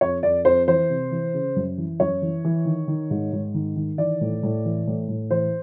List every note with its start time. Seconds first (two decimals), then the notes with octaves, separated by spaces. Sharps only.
0.01 F2 C#5
0.23 F2 D5
0.45 F2 C5
0.67 E3 C5
0.89 C3
1.11 E3
1.34 C#3
1.56 F#2
1.78 E3
2.00 F#2 C#5
2.22 E3
2.44 E3
2.65 D#3
2.88 D#3
3.11 G#2
3.33 G#2
3.54 D#3
3.76 D#3
3.98 E3 D5
4.21 A2
4.43 A2
4.65 E3
4.87 A2
5.08 A2
5.31 E3 C5